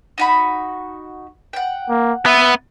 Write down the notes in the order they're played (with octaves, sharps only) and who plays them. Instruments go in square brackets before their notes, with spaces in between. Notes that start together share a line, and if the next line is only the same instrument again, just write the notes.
[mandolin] D#4 F#4 B5
F#5 G5
[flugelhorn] A#3
[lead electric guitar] B3 [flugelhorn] E5